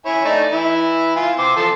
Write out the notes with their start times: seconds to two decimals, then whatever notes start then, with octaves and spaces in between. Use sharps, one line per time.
0.06 E4 C#5 G#5
0.25 A3 D#4 D5
0.52 E3 E4
1.16 F4 G#5
1.39 C4 C6 D6
1.56 F3 A4 C6